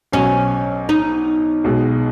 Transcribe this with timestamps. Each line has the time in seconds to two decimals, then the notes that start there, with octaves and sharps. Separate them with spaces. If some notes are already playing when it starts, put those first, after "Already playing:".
0.12 B1 B2 F#3 C#4
0.89 D#4
1.64 B1 B2 G#3